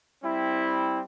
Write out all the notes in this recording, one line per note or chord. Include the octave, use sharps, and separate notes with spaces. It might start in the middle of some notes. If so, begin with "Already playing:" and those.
G3 C4 E4